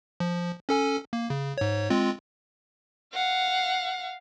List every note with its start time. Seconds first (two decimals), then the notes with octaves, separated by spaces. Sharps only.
0.20 F3
0.69 C#4 A4 G#5
1.13 A#3
1.30 C#3
1.58 G#2 C#5
1.90 G#3 C4 F4
3.14 F5 F#5